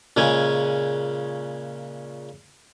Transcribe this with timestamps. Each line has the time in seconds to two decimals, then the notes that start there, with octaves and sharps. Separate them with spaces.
0.17 A#2 C#3 G#3 C#4 G#5